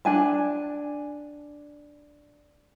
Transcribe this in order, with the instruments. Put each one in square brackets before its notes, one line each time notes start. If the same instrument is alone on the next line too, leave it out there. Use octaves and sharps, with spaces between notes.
[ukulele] D4 G#5 A5